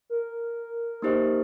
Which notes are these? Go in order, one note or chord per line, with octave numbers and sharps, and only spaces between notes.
A#4
A#3 D#4 G4 C5 D#5